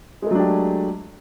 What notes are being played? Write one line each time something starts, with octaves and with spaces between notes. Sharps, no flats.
F#3 G#3 A3 D4 G4